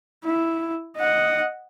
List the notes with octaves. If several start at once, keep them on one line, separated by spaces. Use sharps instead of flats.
E4
D#5 F#5